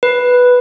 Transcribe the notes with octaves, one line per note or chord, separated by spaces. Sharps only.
B4